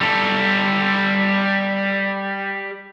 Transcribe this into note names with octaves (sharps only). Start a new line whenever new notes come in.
G3 A4